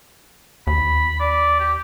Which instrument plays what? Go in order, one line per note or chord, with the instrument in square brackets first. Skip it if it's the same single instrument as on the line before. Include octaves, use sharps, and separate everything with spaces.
[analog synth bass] D#2 [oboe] B5
[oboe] D5
G4